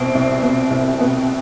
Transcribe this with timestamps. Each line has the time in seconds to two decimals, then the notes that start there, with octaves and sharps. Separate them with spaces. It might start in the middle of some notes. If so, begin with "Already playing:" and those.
Already playing: C2 B2 B3 C4
0.15 C2
0.42 B2 B3
0.71 C2
0.99 B2 B3